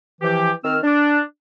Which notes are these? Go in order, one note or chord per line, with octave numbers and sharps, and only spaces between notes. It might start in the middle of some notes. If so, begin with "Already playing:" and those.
E3 F3 G4
D#3 C4 A#4 E6 F6
D4